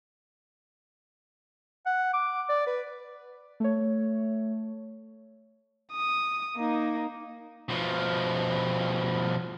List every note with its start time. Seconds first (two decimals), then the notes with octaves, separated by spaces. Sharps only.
1.86 F#5
2.13 D6
2.49 D5
2.67 B4
3.60 A3 C#5
5.92 D#6
6.56 A#3 D#4
7.69 B2 F3